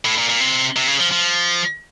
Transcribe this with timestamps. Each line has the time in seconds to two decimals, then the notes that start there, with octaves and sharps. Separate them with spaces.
0.05 A2
0.18 A#2
0.29 A#2
0.40 C3
0.76 C3
0.88 C#3
1.00 F3
1.12 F3